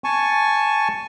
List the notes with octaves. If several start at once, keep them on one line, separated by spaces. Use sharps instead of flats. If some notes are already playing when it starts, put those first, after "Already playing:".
G#5 A5 C#6